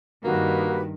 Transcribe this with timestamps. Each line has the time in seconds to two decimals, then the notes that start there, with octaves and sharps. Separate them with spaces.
0.23 G2 D#3 A#3 F#4 G4 B4